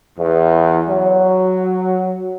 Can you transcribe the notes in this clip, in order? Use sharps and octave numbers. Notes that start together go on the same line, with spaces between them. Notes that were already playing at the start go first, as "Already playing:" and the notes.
E2
F#3